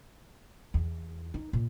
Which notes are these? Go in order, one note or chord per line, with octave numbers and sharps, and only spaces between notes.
E2
D#4
A#2